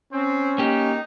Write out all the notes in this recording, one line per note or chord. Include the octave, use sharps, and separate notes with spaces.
C4 C#4
A#3 D#4 G4